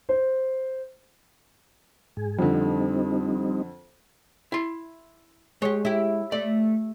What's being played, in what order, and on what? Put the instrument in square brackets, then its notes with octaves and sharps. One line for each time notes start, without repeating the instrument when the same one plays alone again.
[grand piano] C5
[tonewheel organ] G#2 G#4
[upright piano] F2 D3 [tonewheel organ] G3 C4 D#4
[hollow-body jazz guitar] E4 C6
[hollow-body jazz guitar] G#3 [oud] G4 C#5
[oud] E4 G4
[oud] A3 [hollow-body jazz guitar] D5